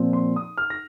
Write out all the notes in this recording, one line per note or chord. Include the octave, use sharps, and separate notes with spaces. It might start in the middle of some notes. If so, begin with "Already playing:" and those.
Already playing: A#2 F3 C4
C6
D#6
F6
A#6